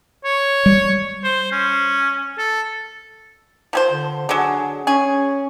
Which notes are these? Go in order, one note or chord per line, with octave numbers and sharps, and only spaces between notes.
C#5
G3
C5
C#4
A4
F3 G#4 C5
D3
D3 F#3 G#4
C#4 G#4